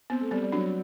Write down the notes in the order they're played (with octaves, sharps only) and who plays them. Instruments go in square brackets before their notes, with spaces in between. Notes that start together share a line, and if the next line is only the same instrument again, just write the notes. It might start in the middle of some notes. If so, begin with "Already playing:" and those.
[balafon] B3 [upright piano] C4
[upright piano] A3
[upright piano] G3 [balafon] B3
[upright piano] G3
[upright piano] F#3 [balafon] D4